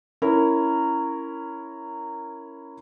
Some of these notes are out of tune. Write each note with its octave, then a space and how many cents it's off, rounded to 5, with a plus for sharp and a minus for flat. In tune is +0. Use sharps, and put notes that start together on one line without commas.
C#4 +0 E4 +0 A#4 -15